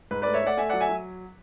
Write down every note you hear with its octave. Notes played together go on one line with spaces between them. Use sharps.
G#2 B4
A3 B4 D5
C#5 E5
A3 D5 F#5
A3 E5 G#5
F#3 D5 F#5
E5 G#5
F#3